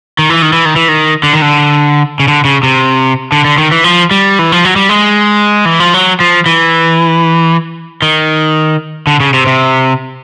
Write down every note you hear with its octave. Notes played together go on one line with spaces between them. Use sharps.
D#3
E3
D#3
E3
D#3
E3
D#3
D3
D#3
D3
C#3
D3
C#3
C3
D3
D3
D#3
E3
F3
G3
E3
F3
F#3
G3
G#3
E3
F3
F#3
F3
E3
D#3
D3
C#3
C3
C3